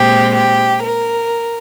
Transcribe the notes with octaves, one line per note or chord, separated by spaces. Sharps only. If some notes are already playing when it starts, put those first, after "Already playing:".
Already playing: A#2 G#3 C4 G4
G4
A#4